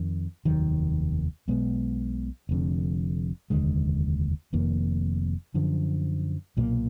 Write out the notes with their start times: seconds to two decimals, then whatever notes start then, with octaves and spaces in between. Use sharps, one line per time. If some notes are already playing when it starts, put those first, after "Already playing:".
Already playing: F2 D#3
0.45 F1 D#2 D#3 F#3
1.48 B1 B2 G#3 B3
2.49 F1 F2 D3
3.50 F1 D#2 D3 G#3
4.53 F1 F2 D#3 A#3
5.54 F#2 D3 F3
6.57 B1 A#2 F#3 A#3